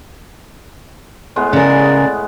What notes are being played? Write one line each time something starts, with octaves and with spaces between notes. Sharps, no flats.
A2 G#3 B3
C#3 A#4 D5